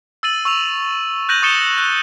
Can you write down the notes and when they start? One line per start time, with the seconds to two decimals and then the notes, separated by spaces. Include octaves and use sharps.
0.23 E6 A6 D#7 F#7
0.45 C#6 E6 D#7 F7
1.29 F#6 G6 A#6 D#7 F#7
1.42 C#6 D#6 A6 C#7 E7 G7
1.78 F#6